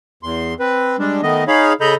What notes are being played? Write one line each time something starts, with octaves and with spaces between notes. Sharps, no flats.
E2 C6
C4 B4
G3 G#3 D4
D#3 A3 B3 D#5
D#4 G#4 C#5 F5 B5
C#3 A4 D#5 A#5 B5 G6